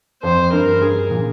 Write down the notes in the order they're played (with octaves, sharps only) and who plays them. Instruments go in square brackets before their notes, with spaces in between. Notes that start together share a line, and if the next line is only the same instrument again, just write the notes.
[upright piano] F2 [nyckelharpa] C5
[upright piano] G2 [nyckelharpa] A#4
[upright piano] G2 [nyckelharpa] G#4
[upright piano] A#2